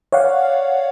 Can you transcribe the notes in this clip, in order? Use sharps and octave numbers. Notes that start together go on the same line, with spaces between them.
C#5 D5 F5 F#5